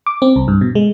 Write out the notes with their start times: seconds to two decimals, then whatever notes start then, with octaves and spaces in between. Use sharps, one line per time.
0.07 D6
0.22 C4
0.36 C2
0.48 G2
0.61 B2
0.75 G#3